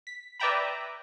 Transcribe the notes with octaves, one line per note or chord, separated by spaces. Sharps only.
B6
B4 D5 E5 G5 A#5 B5